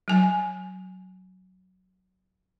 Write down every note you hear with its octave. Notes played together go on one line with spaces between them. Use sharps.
F#3 G#5